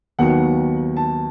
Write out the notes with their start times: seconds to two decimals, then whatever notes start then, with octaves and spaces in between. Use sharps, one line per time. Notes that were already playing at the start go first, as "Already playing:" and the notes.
0.19 D#2 D#3 F#3 B3 F#5
0.97 A5